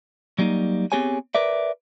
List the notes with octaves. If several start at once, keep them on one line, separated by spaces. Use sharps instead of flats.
F#3 G3 A#3 D#4
B3 C4 G4 G#4 C#5 G#5
A#4 B4 D5 E5